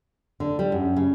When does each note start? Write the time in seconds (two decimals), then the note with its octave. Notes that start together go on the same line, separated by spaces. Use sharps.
0.40 D3
0.59 G3
0.72 F#2
0.96 C#3